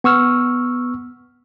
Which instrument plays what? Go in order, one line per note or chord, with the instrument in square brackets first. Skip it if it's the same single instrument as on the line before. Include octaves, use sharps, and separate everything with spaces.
[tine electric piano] B3 C#6 E6 F6